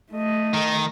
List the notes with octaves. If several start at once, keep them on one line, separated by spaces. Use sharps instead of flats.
A3 D#5
D#3